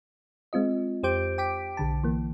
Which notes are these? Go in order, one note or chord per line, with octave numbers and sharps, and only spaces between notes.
G#3 C4 F4 D#5
F2 G4 C5 D6 G6 D7
G5 D6 B6 D7
B1 D3 A5
E3 A#3